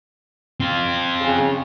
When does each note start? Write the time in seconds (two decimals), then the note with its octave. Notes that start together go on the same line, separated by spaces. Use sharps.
0.60 C4 F4
1.20 C#3